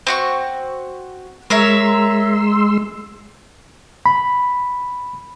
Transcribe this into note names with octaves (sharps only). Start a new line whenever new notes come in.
C4 F#4 C#6
G#3 A#4 C#5 E5 C6 E6
B5